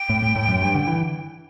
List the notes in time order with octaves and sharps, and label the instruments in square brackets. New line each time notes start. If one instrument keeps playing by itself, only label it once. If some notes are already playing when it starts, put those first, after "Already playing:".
Already playing: [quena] G5
[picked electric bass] A2
A2
A2
F#2
G2
D3
E3